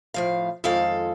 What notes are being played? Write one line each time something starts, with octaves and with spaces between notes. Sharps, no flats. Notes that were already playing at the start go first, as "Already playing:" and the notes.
A2 F3 F5
F2 D#3 G#3 F4 A4 F5